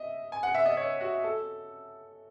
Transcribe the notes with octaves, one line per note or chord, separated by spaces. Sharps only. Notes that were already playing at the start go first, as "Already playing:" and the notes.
Already playing: D#5 E5
G#5
F#5
E5
D#5
C#5
F#4
A4